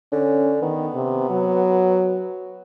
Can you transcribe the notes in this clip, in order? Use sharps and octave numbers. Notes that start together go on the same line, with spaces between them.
D3 C#4
D#3 B3
C3
F#3